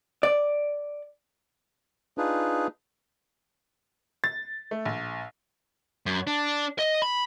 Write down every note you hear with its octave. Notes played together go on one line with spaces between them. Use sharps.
D5
D4 D#4 F4 G#4 B4
A6
A3
A#1
F#2
D4
D#5
B5